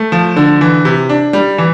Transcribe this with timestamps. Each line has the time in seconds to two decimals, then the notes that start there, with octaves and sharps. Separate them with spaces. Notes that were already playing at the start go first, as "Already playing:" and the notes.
Already playing: A3
0.12 F3
0.36 D3
0.61 E3
0.85 C3
1.09 D4
1.33 G3
1.58 E3